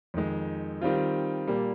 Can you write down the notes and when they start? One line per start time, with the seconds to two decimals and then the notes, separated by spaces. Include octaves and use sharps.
0.14 F2 D#3 G#3
0.81 D#3 G3 C4 F4
1.47 A#2 G3 A#3